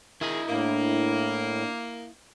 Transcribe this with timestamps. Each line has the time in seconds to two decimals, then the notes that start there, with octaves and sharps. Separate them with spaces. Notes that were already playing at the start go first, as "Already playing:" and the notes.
0.21 D#3 E4 G#4 D#5
0.49 A2 A#3 D4